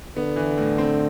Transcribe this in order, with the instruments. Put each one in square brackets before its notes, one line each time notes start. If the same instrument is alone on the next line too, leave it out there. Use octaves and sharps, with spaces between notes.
[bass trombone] D3 [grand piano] B3
[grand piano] E3
A2
C4